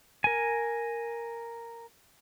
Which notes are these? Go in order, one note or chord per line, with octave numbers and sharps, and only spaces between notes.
A#4 G#5